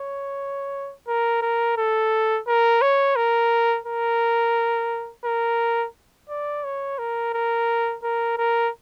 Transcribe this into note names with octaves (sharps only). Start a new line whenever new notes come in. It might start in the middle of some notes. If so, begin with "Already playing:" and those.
Already playing: C#5
A#4
A#4
A4
A#4
C#5
A#4
A#4
A#4
D5
C#5
A#4
A#4
A#4
A#4